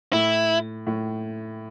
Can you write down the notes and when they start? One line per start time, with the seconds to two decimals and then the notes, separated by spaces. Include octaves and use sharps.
0.13 A2 E4
0.87 A2